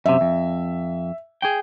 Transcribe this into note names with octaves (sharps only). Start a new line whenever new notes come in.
F#2 C3 E5
F2
G#4 G5